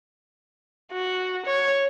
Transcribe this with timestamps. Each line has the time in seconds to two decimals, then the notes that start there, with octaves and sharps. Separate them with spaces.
0.93 F#4
1.46 C#5